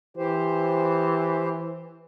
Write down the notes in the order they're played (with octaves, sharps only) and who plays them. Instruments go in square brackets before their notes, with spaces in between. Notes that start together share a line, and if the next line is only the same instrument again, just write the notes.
[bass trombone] E3 [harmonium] G4 C5